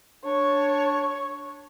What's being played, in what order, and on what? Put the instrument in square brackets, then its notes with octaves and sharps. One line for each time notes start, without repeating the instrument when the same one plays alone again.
[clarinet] D4 [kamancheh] C#5